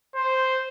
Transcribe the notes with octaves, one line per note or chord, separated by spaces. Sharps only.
C5